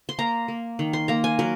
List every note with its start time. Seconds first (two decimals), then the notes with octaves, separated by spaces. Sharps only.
0.09 C6
0.18 A#3 A#5
0.48 A#3
0.79 D#3
0.93 C6
1.08 A#3 A#5
1.24 G#5
1.39 F#3 A#4